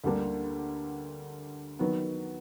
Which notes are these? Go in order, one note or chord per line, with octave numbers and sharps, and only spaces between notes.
D2 D3 G3 A#3 D4
D#3 F#3 B3